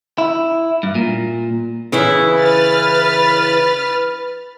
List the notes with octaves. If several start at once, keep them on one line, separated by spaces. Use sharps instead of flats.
E4
G2
A#2
C#3 E3 E4
B4 F6 A6